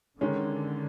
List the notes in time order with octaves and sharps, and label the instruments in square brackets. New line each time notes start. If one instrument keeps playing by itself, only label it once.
[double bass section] D3 [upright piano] D#3 G#3 C#4